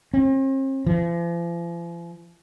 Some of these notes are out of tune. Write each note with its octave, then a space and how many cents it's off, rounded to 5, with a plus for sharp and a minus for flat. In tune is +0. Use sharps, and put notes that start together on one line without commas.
C4 +45
F3 -45